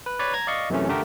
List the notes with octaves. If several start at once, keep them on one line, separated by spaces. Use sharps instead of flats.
B4
B4 C#5 D5
A#5 G#6 A#6
D5 D#5 F5 C#6
F#2 C3 E3 A3 C#4
D3 A3 G4 A#4